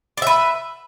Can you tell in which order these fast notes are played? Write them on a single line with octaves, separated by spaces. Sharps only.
D5 E5 B4